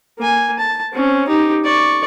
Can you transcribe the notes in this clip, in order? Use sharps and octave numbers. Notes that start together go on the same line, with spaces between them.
A#3 G#5
A5
C4 C#4
D#4 G4
D5 C#6